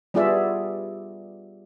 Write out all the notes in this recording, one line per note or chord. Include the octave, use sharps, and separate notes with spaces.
G3 B3 F4 G#4 D5 E5